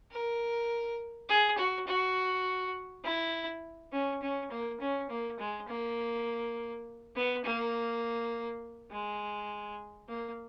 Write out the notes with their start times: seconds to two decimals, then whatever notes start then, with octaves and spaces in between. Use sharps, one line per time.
0.11 A#4
1.29 G#4
1.58 F#4
1.87 F#4
3.04 E4
3.92 C#4
4.22 C#4
4.51 A#3
4.80 C#4
5.10 A#3
5.39 G#3
5.68 A#3
7.15 B3
7.44 A#3
8.91 G#3
10.09 A#3